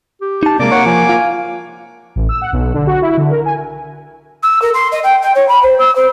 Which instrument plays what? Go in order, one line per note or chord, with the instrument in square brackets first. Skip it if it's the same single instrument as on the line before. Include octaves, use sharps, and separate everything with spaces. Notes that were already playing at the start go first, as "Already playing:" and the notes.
[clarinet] G4
[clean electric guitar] D#4 A5
[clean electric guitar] C3 G#3 [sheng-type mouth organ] A#3 D6 [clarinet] D5
[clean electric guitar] A#4 C#5 [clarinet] F#5
[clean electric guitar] F3 [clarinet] G#5
[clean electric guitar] F4
[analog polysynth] A1
E6
F#5
B1
D3
F#4
E4
D3
A#4
G#5
[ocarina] E6
A#4
C6
D#5
G5
G5
C#5
B5
C5
E6
C5